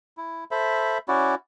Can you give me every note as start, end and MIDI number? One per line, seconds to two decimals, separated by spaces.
0.17 0.44 64
0.51 0.98 69
0.51 0.98 72
0.51 0.98 76
0.51 0.98 83
1.08 1.35 61
1.08 1.35 64
1.08 1.35 66
1.08 1.35 74